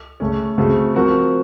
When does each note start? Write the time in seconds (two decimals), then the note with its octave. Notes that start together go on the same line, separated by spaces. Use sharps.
0.20 C#3 A3 C#4
0.58 C#3 A3 C4 F#4
0.95 F3 C4 F#4 A#4